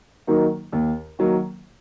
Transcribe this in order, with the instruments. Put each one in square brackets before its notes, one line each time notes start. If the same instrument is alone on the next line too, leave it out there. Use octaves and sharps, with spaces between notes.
[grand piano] D#3 F#3 A#3 D#4
D#2
D#3 F#3 A#3